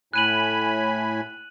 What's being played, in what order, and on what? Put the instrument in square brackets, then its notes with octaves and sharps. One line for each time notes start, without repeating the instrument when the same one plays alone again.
[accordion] A2 G#5 B5 [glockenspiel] F#6 D#7 F#7